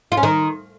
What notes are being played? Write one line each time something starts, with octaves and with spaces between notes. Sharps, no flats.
F4
C#4
D#3